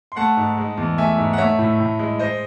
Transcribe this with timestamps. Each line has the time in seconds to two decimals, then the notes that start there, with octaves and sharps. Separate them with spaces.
0.12 C6
0.16 A3 F#5 A5
0.37 G#2
0.58 G#3
0.77 E2
0.98 A3 E5 G#5
1.18 G#2
1.33 F#5
1.38 A3 C#5 E5
1.59 A2
1.80 A2
1.99 G#3
2.19 G#3 C5 D#5